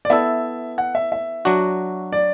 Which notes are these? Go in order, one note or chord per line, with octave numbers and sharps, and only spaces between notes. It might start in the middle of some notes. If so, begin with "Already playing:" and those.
D5
B3 E4 A4 E5
F#5
E5
E5
F#3 D4 F#4
D5